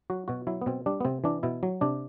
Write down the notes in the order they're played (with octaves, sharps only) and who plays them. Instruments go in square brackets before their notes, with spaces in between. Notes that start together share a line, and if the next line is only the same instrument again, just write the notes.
[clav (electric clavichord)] F#3 F#4
B2 F#4
F#3 E4
B3
B2 C4
G3 D4
B3
C3 C4
E3 D4
B2 E4
F#3
C3 D4